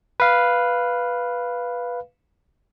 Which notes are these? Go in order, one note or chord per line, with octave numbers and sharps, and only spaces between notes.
B4 F5